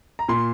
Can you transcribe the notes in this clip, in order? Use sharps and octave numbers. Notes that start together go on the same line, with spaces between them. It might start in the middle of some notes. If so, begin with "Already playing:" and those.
A#5
A#2 C6